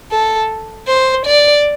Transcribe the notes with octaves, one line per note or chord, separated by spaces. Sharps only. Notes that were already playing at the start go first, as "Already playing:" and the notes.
A4
C5
D5